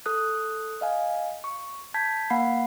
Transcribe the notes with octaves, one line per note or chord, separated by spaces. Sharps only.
A4 D#6 F#6
D#5 F5 G#5
C#6
A5 G6 G#6 B6
A#3 F5 F#5 B5 C7